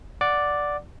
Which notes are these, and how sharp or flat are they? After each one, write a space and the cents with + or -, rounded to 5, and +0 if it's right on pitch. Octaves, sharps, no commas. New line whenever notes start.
D5 +0 F#5 -5 D6 +0